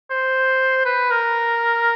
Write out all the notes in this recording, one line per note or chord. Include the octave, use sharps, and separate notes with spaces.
C5
B4
A#4